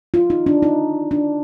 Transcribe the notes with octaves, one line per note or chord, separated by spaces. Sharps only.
F4
D#4
D4
D#4
D4